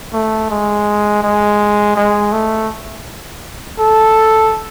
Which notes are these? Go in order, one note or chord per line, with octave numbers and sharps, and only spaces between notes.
A3
G#3
G#3
G#3
A3
A4